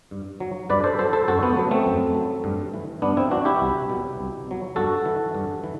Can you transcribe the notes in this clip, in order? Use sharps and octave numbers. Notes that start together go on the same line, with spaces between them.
G2
F#3
G2 B4 D5
A4 C5
F#3 A4 C5
A4 C5
F#2 F#4 A4
B3
F#3 B3
A3 C4
F#2
F#3
G2
E3
G2 B3 D4
C4 E4
E3 D4 F#4
E4 G4
C2
B2 F#3
C2
B2 F#3
G2 F#4 A4
E3
G2
E3